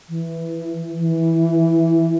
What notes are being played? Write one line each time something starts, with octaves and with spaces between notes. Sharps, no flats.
E3
E3